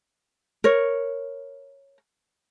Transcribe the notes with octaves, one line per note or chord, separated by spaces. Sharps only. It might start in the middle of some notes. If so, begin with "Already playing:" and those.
A#4 C#5